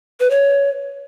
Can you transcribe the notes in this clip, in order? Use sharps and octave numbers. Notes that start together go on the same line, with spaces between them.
B4
C#5